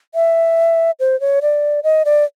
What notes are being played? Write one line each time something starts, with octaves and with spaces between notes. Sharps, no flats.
E5
C5
C#5
D5
D#5
D5